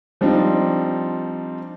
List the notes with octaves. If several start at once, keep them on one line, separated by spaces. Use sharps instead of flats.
F3 G3 C4 D4 D#4 F4